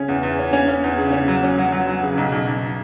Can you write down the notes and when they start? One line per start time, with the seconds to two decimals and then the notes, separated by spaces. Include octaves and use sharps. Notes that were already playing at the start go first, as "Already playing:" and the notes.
Already playing: C#3 C#4
0.08 E2
0.23 E2
0.39 C#4
0.53 C#4
0.68 C#4
0.84 E2
0.98 C#3
1.12 C#4
1.28 F#3
1.43 C#4
1.58 F#3
1.72 F#3
1.88 F#3
2.03 C#3
2.17 B1
2.32 B1
2.47 B1